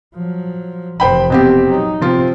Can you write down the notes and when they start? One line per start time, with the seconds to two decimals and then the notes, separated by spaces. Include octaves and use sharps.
0.15 F3 F#3
1.00 F1 E2 C5 G5 B5
1.30 B2 C4 G4
1.68 F#3 D#4
2.01 C3 F3 C4 F4